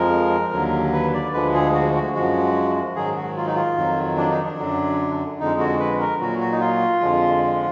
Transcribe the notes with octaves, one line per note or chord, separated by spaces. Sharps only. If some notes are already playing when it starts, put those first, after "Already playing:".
Already playing: F2 F3 G#3 A#4
D#2 D3 F#3
B4
D5
D2 D3 F3 G#3 B4
G#4
F#4
F#4
F#2 F3 G#3 F#4
G#2 D#3 F#3 G#4
F#4
F4
D#4
F4
F2 D#3 F#3
D4
D#4
D4
F#2 D3 F#3
F2 D3 G#3 D#4
F#4
B4
A#4
A#2 F#3 F#4
F#4
D#4
F4
F2 D3 F3 G#3